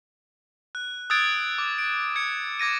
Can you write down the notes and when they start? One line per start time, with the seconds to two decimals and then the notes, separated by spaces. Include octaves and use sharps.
0.75 F#6
1.10 D#6 E6 F#6 G#6 A6 D7
1.58 D6
1.78 D7
2.16 G#6 C#7
2.59 D6 G#6 A#6 D#7